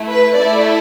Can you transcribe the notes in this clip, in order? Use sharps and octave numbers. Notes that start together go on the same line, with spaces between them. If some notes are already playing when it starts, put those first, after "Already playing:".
Already playing: A3 E4
B4
A3 E4 A4 D5